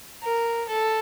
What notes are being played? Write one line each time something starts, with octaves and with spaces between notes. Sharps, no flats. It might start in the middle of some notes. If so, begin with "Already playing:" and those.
A#4
A4